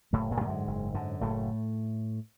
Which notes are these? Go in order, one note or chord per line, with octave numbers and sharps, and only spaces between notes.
F#1 A2 A3
A#2 A#3
F#2 G#2 D3 G#3 A3
F#1
F#2 D3
F#1 A2 A3